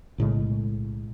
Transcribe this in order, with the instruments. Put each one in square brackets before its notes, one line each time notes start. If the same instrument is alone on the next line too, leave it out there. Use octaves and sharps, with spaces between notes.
[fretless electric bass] B1 A2 C#3 G#3